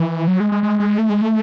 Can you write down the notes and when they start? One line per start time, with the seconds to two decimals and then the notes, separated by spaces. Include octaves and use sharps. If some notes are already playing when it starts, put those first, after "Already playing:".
Already playing: E3
0.28 F#3
0.40 G#3
0.52 G#3
0.63 G#3
0.80 G#3
0.98 A3
1.10 G#3
1.21 A3